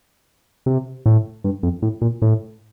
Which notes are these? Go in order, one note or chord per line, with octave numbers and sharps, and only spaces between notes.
C3
A2
G2
F2
A2
A#2
A2